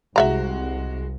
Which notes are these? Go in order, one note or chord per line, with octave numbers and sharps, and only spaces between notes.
C2 G#3 F#4 E5 F5 A#5